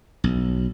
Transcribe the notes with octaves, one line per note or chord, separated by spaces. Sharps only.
B1